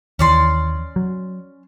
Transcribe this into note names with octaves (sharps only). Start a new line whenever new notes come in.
D#2 E3 C#4 D5 C6
F#3